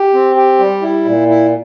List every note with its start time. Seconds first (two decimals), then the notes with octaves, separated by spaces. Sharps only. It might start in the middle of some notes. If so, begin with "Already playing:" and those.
Already playing: G4
0.14 C4
0.36 G4
0.59 G3
0.82 E4
1.05 A#2
1.28 E4